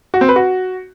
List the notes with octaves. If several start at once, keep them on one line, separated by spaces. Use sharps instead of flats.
F#4
C4
B4
F#4